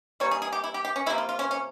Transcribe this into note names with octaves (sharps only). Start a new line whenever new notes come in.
E3 G3 A#3 C#5
G#4
G#4
G4
E4
G4
G4
C#4
C3 F3 A#3 E4
F4
F4
C#4
C#4